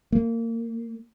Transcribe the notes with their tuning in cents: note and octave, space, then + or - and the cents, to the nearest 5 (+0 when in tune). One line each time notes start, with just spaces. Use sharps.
A#3 -25